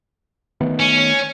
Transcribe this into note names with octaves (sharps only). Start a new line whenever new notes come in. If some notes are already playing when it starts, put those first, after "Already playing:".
D#3 A3 B3
C#4